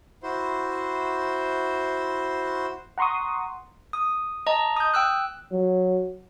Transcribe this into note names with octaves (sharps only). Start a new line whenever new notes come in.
E4 F#4 C5
F#5 A#5 C6 C#6 D#6
D#6
D#5 A5 A#5
D#6 G6
G5 E6 F#6
F#3